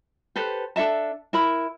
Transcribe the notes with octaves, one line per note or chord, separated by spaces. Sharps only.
G4 A4 B4 C5
D4 A4 E5 A5
E4 A#4 B5